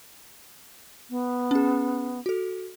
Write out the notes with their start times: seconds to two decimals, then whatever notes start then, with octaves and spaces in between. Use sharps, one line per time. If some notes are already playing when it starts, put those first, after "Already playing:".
1.10 B3
1.51 C#4 G#4
2.26 F#4 A4